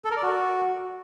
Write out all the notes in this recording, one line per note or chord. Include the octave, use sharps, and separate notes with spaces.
A4
A#4
D5
F#4